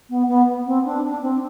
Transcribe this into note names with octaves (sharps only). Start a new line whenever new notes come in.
B3
B3
C4
D4
D4
C4